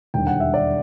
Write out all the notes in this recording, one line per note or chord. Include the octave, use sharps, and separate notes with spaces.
E1 D#2 D3 G3 G5
F#5
E5
D5